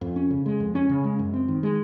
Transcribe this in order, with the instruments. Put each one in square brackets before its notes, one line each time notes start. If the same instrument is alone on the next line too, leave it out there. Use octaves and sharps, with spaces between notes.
[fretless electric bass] F2
C#4
C#3
G#3
F2
C#4
C#3
G#3
F#2
C4
D#3
G#3